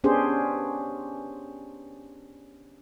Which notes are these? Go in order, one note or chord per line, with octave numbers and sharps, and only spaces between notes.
B3 C#4 D4 G4 G#4 C5